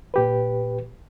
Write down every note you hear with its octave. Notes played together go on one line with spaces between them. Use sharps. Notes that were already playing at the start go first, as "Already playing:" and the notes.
A#2 G4 B4